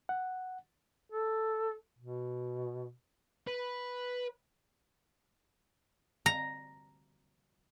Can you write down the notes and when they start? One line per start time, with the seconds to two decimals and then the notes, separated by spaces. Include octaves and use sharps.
0.09 F#5
1.11 A4
1.99 B2
3.48 B4
6.26 A#5